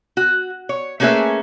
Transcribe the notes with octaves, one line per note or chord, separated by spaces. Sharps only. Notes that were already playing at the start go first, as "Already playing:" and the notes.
F#4
C#5
A3 A#3 C#4 G#4 B4 E5